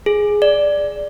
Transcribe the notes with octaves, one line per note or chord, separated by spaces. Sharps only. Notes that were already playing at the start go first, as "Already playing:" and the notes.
G#4
D5